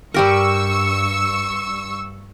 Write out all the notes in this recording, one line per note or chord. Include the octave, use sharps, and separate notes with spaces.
G2 G3 G4 A#4 C#6 E6